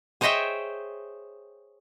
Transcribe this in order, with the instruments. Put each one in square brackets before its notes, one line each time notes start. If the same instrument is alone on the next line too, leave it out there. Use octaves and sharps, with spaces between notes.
[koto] G#4 C5 C#5 D#5 E5 G5